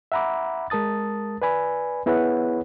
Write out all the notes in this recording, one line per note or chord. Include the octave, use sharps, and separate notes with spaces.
E5 F#5 A#5 B5 D6
G#3 A#4 A5 D#6 A6
B4 D5 G#5 B5
B3 E4 G#4 B4 C#5 F#5